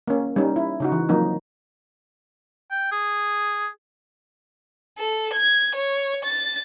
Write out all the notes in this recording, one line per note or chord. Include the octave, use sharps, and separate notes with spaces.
A#3 C#4
G3 C#4 D#4
E4
C#3 D#4 F#4
E3
F3 F#3 A#3 C4 D#4
G5
G#4
A4
G#6
C#5
A6